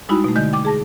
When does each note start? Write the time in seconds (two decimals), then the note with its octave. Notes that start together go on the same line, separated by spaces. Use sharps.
0.09 G3 G#3 D#4 E4 F#4 B5
0.24 B2 A3
0.36 D3 G#3 D#5 G6
0.53 G5 D6
0.65 G#4 A5 A#6